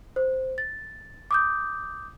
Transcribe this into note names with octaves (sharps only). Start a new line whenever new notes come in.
C5
A6
D6 D#6 G6